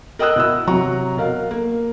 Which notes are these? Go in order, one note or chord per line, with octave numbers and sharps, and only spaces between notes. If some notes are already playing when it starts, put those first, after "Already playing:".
A#4 D#5 G5 D#6 E6 F#6
B2 E4 E6
C3 F#3 A#5 C#6
B2 A#4 F5
A#3